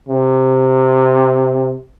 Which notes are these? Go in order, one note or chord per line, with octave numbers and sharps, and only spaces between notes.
C3